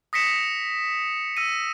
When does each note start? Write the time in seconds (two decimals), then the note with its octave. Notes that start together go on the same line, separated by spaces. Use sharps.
0.13 D#6 A#6 B6 C#7 E7
1.37 E6 A#6 D#7